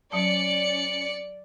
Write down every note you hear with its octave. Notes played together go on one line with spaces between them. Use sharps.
F#3 C#4 D5 A5 C#7